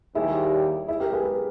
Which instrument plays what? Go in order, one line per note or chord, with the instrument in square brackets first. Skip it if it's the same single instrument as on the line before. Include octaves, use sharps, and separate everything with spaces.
[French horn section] D#2 D#3 G3 [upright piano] E4 G#4
[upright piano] E4 G#4
G4 A#4
G#4 B4
G#4 B4